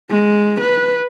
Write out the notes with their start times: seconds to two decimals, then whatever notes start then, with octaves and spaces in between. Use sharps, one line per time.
0.10 G#3
0.61 B4